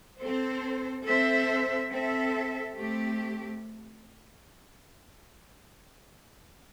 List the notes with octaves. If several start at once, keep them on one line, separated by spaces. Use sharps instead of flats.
C4 A4 C5
C4 A4 C5 E5
C4 A4 E5
A3 C4 G4